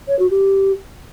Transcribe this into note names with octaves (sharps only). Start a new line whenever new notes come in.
C#5
F#4
G4